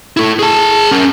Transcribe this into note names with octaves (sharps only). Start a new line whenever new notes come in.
E4 A4
G#4 A5
C#4 A#4